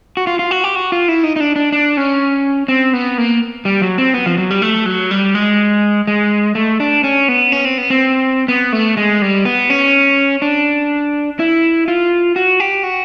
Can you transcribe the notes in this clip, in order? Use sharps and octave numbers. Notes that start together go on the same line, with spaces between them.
F#4
F4
F4
F#4
G4
F#4
F4
E4
D#4
D#4
D4
D4
D4
C#4
C4
B3
A#3
G3
F#3
C4
B3
F3
F#3
G3
A3
F#3
G3
G#3
G#3
A3
D4
C#4
B3
C#4
C4
B3
C4
B3
A3
G#3
G3
B3
C#4
D4
E4
F4
F#4
G4
F#4